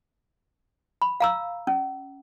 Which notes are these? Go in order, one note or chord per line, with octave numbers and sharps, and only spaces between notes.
B5
F5 A#5 E6
C#4